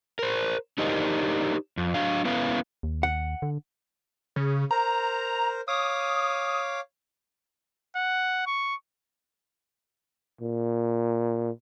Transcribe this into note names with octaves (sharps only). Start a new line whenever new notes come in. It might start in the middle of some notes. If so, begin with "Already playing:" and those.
A#4 C5
D4 D#4 G4 A#4 C5 D#5
F2
F#3 D4 F5
B3 C#4 E4 B4 F5
D#2
F#5
D3
C#3
A#4 C5 A#5
C#5 F5 D6 D#6
F#5
C#6
A#2